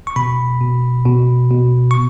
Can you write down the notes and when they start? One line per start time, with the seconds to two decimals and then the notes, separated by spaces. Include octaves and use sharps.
0.07 C#6
0.16 B2 B5
0.61 B2
1.05 B2
1.51 B2
1.91 C#6